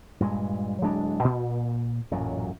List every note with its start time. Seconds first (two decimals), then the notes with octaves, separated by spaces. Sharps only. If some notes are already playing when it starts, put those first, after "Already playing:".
0.20 G2 A#2 G#3
0.81 D1 F#3 G#3 D4
1.24 A#2
2.11 A1 F#2 A#2 F#3